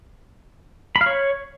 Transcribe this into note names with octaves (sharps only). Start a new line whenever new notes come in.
B5
F5
C#5